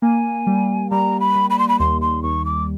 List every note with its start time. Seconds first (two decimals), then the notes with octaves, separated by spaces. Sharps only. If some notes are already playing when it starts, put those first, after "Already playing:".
0.02 A#3 G#5
0.47 G3
0.90 G3 A#5
1.20 B5
1.36 G3
1.50 B5
1.59 C6
1.68 B5
1.79 D#2 C6
2.02 C6
2.23 D#2 C#6
2.45 D6